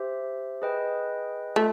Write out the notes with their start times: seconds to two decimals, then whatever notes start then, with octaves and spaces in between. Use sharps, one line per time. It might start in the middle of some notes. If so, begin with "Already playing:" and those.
Already playing: G4 C5 E5
0.62 G#4 B4 D#5 G5
1.56 A3 F4 A4